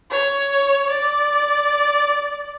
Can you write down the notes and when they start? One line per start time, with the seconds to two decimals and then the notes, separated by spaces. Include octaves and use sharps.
0.10 C#5
0.90 D5